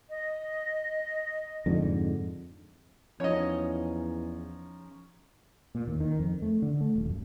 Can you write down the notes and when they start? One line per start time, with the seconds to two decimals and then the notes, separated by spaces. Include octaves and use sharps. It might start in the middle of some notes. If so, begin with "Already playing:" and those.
0.10 D#5
1.66 F2 G#2 D3
3.20 E2 F3 C#4 D#4 C#5 D#5
5.75 A#2
5.87 D#2
6.00 D#3
6.19 F2
6.42 A3
6.62 D3
6.81 A3
6.96 D#1
7.10 F#2